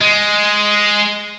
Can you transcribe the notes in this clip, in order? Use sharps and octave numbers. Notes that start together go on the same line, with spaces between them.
G#3